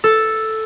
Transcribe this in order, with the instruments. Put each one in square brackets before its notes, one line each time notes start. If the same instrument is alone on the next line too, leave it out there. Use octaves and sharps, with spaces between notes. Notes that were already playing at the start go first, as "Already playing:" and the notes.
[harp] A4